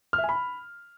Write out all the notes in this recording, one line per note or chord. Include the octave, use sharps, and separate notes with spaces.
F6
E5
G#5
B5